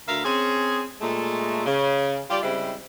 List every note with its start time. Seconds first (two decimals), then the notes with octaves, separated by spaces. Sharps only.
0.07 D2 A#4 E5 F5
0.24 C4 C#4 G#4
1.01 A#2 G#3 A3
1.65 C#3
2.30 G3 F4 G4 D5
2.43 C#3 G3 G#3 C4 E4